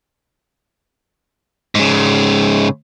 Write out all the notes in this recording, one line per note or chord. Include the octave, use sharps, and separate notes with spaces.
G#2 C#3